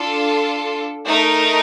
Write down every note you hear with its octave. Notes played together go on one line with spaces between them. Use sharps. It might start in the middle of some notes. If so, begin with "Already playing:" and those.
Already playing: D4 F4 A4
A3 D#4 A#4